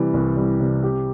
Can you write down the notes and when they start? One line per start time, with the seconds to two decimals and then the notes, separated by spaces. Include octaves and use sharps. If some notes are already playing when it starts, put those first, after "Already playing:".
Already playing: C3 E3 G3
0.14 C2
0.36 G3
0.60 C3
0.84 G4